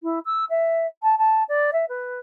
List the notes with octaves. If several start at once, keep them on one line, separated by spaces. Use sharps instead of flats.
E4
E6
E5
A5
A5
D5
E5
B4